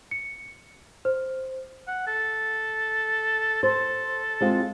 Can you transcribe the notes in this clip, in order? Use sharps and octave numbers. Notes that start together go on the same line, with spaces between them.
C#7
C5
F#5
A4
A4 C5
G#3 C4 F4